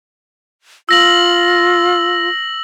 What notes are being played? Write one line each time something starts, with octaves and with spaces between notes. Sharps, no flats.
F4 E6 A#6 F#7